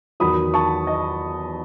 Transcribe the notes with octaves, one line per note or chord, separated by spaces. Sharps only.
E2 D#3 F#3 B5 D#6
A5 C#6
D#5